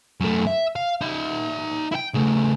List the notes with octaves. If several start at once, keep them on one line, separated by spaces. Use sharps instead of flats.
F#2 A3
E5
F5
D#4 E5
E4 G5
C#3 A3